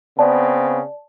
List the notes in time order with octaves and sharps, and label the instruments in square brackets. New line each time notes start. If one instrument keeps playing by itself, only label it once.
[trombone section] C#3 B3 C4 [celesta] D5 A5